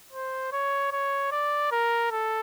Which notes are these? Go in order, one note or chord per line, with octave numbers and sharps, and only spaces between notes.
C5
C#5
C#5
D5
A#4
A4